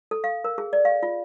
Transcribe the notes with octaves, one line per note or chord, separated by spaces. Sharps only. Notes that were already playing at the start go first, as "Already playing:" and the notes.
A4
F5
A#4
G#4
D5
F5
F4